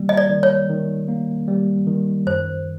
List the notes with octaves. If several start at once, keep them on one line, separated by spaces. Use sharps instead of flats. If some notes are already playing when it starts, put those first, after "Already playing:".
Already playing: D#3 G3 A#3
D#5
D5
D#3
C#5
D#3
A#3
G3
D#3
F#2 C5